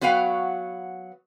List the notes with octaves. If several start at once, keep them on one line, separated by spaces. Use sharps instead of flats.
F#3 B3 F#4 B4 F5 G5